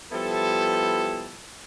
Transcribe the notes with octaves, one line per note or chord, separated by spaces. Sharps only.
F3 G3 B3 E4 A4